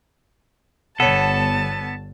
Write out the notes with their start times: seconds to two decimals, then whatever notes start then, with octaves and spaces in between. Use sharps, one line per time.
1.00 G1 D3 B3 A4 C#5 F#5 A5